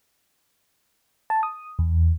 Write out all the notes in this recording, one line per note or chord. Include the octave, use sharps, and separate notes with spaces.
A5
D#6
E2